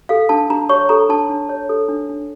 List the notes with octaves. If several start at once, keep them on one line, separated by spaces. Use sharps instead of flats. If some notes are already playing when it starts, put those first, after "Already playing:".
A4 F5
D4 A5
D4 A#5
C#5 C#6
A4 A#5
D4 A5
D4
C#5
A4
D4
D4